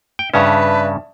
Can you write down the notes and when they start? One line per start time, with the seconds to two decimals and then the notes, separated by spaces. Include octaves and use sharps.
0.19 G5
0.34 G2 C#3 C#4 B4 D5 E5 A5